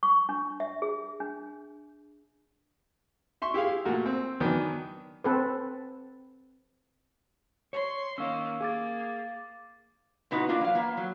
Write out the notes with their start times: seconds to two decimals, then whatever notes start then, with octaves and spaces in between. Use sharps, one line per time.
0.03 C#6
0.29 D4
0.60 E5
0.82 G#4
1.20 D4
3.42 E5 C6 C#6
3.54 E4 G4 G#4 F5
3.85 A#2 A3 F#4 A#4
4.06 C4
4.40 D#3 E3 F#3 B3 D4
5.24 C4 A4 B4
7.73 C#5 C6
8.18 D#3 A#3 C#4 F5 E6
8.60 A#3 G#4 F5 D6 A6
10.31 A2 C3 B3 D#4 F#4
10.49 A#3 D4 F4
10.61 F#3 F5
10.75 A#3 B3
10.97 F#3